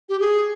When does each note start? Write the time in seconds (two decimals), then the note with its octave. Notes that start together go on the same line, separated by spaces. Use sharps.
0.09 G4
0.20 G#4